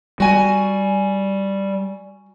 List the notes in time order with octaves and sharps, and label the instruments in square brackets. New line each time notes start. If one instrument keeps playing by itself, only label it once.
[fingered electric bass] G3 [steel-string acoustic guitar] F#4 G#5